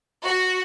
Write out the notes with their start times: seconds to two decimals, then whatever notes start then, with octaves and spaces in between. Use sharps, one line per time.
0.25 F#4